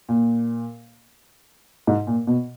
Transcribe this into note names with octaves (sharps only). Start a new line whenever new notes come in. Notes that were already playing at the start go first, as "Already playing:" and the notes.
A#2
G#2
A#2
B2